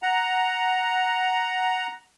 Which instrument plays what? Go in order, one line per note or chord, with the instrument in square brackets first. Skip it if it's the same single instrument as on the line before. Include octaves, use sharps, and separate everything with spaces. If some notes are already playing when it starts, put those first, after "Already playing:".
[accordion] F#5 A#5